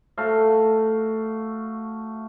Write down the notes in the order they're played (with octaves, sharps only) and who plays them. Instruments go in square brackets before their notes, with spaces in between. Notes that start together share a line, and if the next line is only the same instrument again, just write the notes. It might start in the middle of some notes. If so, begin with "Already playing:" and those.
[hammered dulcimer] A3 F#4 F5